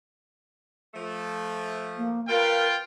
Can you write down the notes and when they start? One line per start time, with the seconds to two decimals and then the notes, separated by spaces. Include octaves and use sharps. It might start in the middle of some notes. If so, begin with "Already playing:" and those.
0.94 F3 A3
1.97 A#3
2.28 A3 F4 A#4 B4 F5 G5